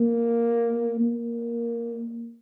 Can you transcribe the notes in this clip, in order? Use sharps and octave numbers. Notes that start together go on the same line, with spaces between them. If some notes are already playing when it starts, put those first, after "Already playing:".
Already playing: A#3
A#3